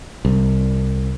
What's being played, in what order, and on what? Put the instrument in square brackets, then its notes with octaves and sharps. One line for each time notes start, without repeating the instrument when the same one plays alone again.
[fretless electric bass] C2